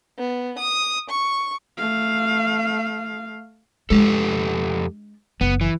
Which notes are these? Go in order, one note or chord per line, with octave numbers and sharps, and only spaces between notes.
B3
D#6
C#6
A3 F5
F2 G#3 D4 G4 A4
F#1 B3
E3